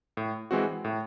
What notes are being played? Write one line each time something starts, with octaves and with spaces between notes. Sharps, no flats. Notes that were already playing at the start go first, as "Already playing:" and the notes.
A2
E3 G#3 C4 F#4
A2